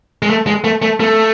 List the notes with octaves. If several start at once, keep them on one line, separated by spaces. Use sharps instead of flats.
G#3
A3
G#3
A3
A3
A3